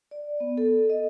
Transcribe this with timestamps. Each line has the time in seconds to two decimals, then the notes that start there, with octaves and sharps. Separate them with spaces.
0.11 D5
0.40 B3
0.58 A4
0.89 D#5